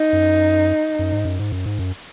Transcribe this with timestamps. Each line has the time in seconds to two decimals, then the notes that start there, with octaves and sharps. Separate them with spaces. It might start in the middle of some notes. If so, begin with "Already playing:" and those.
Already playing: D#4
0.13 F#2
0.99 F#2
1.12 G#2
1.25 F#2
1.39 G#2
1.52 F#2
1.66 G#2
1.79 F#2